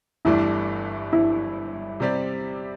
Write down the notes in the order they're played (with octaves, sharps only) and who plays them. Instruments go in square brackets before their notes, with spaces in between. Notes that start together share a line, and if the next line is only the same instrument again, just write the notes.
[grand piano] G1 G2 E3 A3 D4 [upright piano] E4
[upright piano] E4
[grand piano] C3 G3 C4 G4 D5